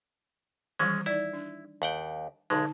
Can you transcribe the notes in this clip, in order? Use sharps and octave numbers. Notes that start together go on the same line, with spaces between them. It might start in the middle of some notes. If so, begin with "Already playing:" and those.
D#3 E3 G3 G#3 C#4
D#4 E4 D5
D4
D#2 F#5 G5
B1 D3 G#3 D#4 A5